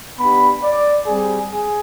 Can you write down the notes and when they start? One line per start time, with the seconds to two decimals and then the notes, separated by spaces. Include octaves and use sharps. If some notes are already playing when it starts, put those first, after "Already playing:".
0.20 B3 D4 G4 B5
0.64 D5
1.07 G3 C4 G4 G#4
1.51 G#4